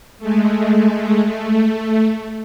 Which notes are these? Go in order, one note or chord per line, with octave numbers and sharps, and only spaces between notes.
G#3 A3
A3